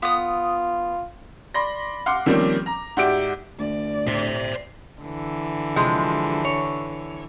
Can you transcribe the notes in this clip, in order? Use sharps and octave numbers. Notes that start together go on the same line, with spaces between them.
B3 F4 D#6
D5 B5 C6 A#6
F5 F#5 C6 D6
D#3 F3 G3 A#3 C4 C#4
A#5
G#2 F#4 G4 D5 E5 D7
D2 D5
A2 C5 E5
D3 E3
C3 F3 G#3
C#5